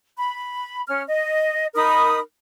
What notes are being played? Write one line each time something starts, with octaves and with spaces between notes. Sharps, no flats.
B5
C#4 F6
D#5
D#4 A#4 B5 D#6